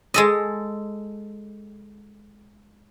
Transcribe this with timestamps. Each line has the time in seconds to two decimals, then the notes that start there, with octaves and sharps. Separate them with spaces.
0.14 G#3 A4 D#5